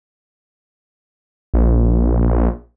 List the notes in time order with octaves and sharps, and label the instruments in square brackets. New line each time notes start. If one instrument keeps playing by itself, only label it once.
[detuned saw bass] A#1